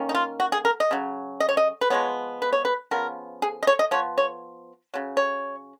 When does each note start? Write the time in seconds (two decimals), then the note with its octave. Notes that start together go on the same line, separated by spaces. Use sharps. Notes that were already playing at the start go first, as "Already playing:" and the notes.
Already playing: D#3 A#3 C#4
0.09 D#4
0.15 F4
0.40 F#4
0.52 G#4
0.65 A#4
0.80 D#5
0.91 C#3 F#3
1.40 D#5
1.49 C#5
1.57 D#5
1.81 B4
1.90 F3 G#3 B3 C#5
2.42 B4
2.53 C#5
2.65 B4
2.91 C#3 F3 B3 A#4
3.42 G#4
3.63 D#5
3.67 C#5
3.79 D#5
3.91 F3 B3 C#5
4.18 C#5
4.94 C#3 F#3
5.17 C#5